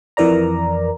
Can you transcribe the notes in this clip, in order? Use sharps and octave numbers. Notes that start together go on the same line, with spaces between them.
F2 E3 A#4 D5 A#5